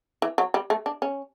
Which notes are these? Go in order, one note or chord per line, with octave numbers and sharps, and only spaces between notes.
E3
F#3
G3
A3
D4
C#4